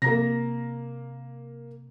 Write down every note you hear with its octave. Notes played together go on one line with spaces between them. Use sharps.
C3 A#3 A#5 A#6